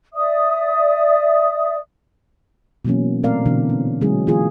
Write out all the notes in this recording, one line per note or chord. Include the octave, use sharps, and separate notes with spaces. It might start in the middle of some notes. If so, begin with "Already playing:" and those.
D5 E5 D#6
B2 E3 F#3 A#3 C#4
A#2 A3 C4 A#4 D5 F5
B2 D3 E3 D4
C#4
D3 F#3 G#3 C#4 E4 G#4
E3 A#3 F4 G#4